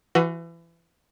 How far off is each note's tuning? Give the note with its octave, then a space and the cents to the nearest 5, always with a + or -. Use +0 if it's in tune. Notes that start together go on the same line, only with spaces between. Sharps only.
E3 +30 F#4 +0 B4 +15